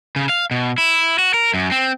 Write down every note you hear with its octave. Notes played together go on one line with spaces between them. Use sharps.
C#3
F5
B2
E4
F#4
A#4
F#2
C4